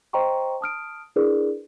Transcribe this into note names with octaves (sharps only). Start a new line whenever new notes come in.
C5 D#5 G5 A#5 C6 C#6
A5 D#6 F6 D7
D4 E4 G#4 A#4 B4 D5